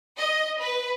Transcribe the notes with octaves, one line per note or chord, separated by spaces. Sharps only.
D#5
B4